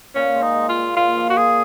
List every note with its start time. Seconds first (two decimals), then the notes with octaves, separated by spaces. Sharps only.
0.15 A#2 C#4
0.35 G#3
0.42 D#4
0.56 G#3
0.69 F4
0.76 A#2
0.97 A#2 F4
1.16 F3
1.30 F#4
1.37 A#2 G#4